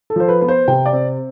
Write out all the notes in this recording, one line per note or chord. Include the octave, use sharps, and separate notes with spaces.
A4
F3 C5
B4
B3 B4
C5
C3 G5
D5
C4